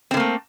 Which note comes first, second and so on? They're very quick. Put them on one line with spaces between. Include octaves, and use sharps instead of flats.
C4 D3 A#3 A3